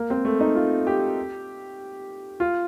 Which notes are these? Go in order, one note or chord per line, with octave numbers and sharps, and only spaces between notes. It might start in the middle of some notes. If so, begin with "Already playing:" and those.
Already playing: A#3
C4
A3
D#4
F4
G4
F4